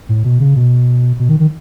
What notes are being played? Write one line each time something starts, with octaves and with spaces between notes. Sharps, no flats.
A2
B2
C#3
B2
B2
D#3
D#3